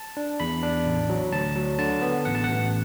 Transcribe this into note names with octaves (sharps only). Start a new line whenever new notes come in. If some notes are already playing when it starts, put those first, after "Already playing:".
Already playing: A5
D4
E2 B5
D4
A1
F#3
D2 A5
F#3
D3 A5
B3
A1 F#5
A5
A1 F#5